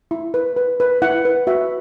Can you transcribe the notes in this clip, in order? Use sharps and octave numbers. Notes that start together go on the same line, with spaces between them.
E4
B4
B4
B4
E4 F#5
B4
F#4 E5